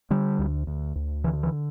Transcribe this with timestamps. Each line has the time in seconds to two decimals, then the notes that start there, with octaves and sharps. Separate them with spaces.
0.10 D3 G3
0.39 D2
0.67 D2
0.96 D2
1.24 D3 E3
1.43 E3